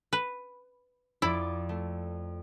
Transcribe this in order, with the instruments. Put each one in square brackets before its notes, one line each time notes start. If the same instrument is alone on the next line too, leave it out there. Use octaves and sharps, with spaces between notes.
[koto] B4
[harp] F2 D5 D6 [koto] E4
[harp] A3